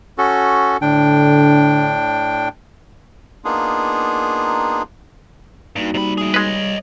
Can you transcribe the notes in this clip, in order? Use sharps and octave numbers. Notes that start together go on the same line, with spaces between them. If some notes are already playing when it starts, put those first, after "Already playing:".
C#4 F#4 A4
A2 D3 D4 G5
A#3 B3 D4 D#4 F4 G#4
G2 A#3 D#4 F#4
C3 G3 B5
A3 G#4
G#3 B4 C#5 D#5